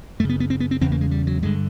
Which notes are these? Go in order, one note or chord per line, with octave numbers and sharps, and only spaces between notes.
F#2 C#3 A3
B3
B3
C4
B3
C4
E2 C#3 C4
A#3
G#3
G3
F#3
G2 D3 G#3